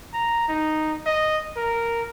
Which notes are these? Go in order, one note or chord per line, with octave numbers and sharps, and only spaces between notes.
A#5
D#4
D#5
A#4